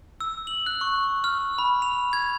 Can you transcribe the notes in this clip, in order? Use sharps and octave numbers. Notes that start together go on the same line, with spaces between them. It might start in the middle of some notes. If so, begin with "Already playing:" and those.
E6
F#7
F#6
C#6
F6
B5
F7
G#6